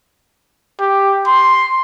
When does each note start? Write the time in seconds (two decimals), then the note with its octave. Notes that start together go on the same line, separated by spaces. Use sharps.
0.80 G4
1.27 C6